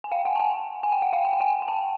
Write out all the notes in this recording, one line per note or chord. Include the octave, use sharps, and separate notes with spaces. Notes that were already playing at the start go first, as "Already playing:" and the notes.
G#5
F5 G5
F#5 G#5
A5
F#5 G#5
G#5
G5
F#5
F5 G5
G#5
G5
F#5 G#5
G#5
G5 A5